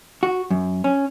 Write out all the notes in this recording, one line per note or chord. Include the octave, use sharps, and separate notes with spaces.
F#4
F#2
C#4